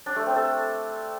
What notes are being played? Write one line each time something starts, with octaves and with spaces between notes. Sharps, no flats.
D4
A3
C4
A4